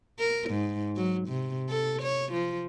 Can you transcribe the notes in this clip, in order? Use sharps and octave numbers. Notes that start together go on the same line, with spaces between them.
A#4
G#2
F#3
C3
A4
C#5
F3